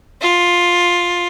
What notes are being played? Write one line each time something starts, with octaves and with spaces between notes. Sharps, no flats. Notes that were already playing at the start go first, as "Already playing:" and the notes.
F4